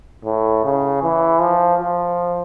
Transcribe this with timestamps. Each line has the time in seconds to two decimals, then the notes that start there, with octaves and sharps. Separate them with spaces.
0.25 A2
0.65 C#3
1.03 E3
1.40 F3
1.80 F3